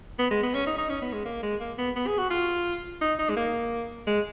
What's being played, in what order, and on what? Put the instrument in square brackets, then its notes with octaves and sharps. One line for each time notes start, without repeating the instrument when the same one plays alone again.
[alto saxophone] B3
G#3
B3
C#4
D#4
D#4
C#4
B3
G#3
A#3
G#3
A#3
B3
B3
G#4
F#4
F4
D#4
D#4
G#3
A#3
G#3